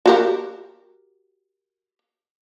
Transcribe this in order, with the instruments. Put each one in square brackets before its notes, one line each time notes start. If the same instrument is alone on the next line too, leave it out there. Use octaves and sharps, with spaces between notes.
[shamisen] F#4 G4 A#4